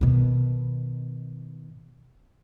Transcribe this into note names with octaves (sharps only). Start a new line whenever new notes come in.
B2 D#3